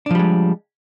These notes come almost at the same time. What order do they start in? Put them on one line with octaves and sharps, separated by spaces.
D4 F3 G3 G#3